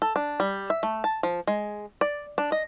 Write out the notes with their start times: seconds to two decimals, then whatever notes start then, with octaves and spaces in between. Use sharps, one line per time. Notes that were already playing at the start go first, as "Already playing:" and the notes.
0.02 A4
0.16 D4
0.40 G3
0.70 E5
0.83 A3
1.04 A5
1.23 F3
1.47 G#3
2.01 D5
2.38 D4
2.52 D#5